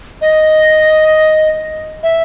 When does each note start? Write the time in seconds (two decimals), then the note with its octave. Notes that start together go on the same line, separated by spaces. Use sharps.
0.21 D#5
2.03 E5